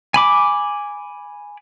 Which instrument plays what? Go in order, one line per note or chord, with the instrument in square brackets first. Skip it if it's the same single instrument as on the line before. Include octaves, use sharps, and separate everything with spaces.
[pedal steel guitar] G#5 B5 D6